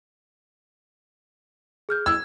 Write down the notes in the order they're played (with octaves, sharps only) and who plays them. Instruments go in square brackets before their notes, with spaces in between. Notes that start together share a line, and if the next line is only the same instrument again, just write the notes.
[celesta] G#4 F6 G6
[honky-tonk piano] E6 [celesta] G#6